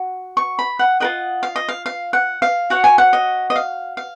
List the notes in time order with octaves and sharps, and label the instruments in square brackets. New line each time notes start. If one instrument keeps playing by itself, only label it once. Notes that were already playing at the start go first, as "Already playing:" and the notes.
Already playing: [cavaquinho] F#4
C#6
B5
F#5
F4 A#4 D#5 F#5
F5
D#5
F5
F5
F#5
F5
F#4 C#5 F#5
G#5
F#5
D#5
D#5
F5
F5